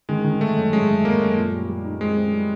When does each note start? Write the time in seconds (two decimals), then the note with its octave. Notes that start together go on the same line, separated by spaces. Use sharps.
0.09 D#3 G#3
0.24 D#3
0.40 D#3 A3
0.56 F#2
0.73 F#2 G#3
0.88 F#2
1.05 F#2 A#3
1.20 F#2
1.36 A#2
1.53 G3
1.69 G3
1.84 D#4
2.00 G#3 C4
2.17 C4
2.32 G3